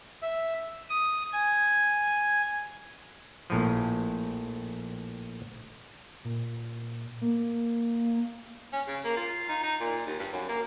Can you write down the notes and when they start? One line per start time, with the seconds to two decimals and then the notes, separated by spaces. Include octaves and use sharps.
0.22 E5
0.89 D#6
1.32 G#5
3.50 A#1 A2 F3
6.25 A#2
7.21 A#3
8.73 C#4
8.87 C#3
9.04 A#3
9.17 F4
9.49 D#4
9.63 D#4
9.80 A#2
10.06 D#2
10.19 G2
10.32 F#2
10.49 A#3